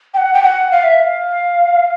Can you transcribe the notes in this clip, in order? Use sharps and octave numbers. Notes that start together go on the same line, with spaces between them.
G5
F#5
G5
F#5
F5
E5
F5